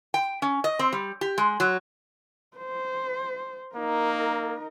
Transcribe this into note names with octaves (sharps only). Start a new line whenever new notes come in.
G5
C#4
D#5
C4
G3
G4
G#3
F#3
C5
A#3 D#4 A#4